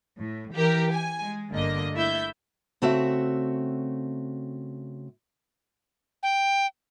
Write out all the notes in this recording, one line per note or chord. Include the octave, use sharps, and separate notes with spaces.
A2
E3 G4 A#4
G#5
G#3
G1 D3 A#3 D#5
A3 E4 E5 G6
C#3 A3 C4 F#4 E5
G5